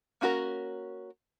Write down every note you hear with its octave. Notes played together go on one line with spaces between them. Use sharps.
A#3 C#4 F#4 G#4 A#4